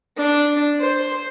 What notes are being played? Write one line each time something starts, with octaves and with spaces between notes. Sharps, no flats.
D4
C5